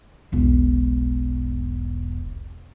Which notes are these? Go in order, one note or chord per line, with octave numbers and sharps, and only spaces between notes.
E1 B1